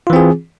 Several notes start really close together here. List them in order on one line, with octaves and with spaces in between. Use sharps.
F4 E3 C4 G#4